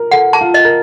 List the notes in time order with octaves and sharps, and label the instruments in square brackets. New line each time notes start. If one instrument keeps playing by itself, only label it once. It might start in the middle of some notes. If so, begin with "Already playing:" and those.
Already playing: [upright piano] A#4
[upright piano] A4 [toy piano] F#5
[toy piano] A5
[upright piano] F4
[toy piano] D#5
[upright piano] A#4